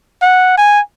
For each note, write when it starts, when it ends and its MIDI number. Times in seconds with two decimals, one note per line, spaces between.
0.22 0.53 78
0.58 0.80 80